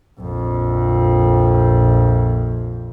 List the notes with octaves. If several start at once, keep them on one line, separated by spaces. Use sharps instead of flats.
A#1 F2